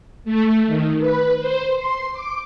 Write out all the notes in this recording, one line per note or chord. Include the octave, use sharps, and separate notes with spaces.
A3
D#3
B4
C5
C6
D6